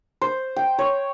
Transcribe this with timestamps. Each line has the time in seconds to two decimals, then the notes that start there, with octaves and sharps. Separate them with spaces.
0.21 C5
0.56 G5
0.78 C#5